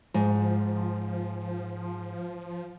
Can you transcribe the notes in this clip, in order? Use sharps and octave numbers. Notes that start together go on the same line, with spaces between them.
G#2 F3